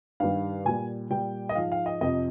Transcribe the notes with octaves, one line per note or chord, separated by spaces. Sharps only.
G2 D#3 G3 F5
A#2 G3 G#5
A#2 G3 G5
D#5
G#2 F3 F5
F5
D#5
F2 C3 F3 D#5